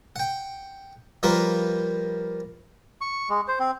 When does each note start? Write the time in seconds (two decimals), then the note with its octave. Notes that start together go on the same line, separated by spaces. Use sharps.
0.16 F#5 G5
1.23 F3 G3 A#3 F4 A#4 B4
3.01 C#6
3.30 G#3
3.48 C5
3.60 C4